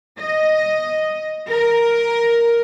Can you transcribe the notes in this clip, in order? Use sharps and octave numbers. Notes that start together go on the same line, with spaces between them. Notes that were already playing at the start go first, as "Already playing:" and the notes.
D#5
A#4